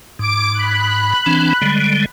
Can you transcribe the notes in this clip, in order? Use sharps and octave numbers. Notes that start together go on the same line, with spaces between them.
G#2 D6 D7
B5 F#6
E3 C4 D4
D3 G3 G#3